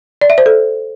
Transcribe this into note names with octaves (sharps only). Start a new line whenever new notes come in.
D5
E5
C5
A4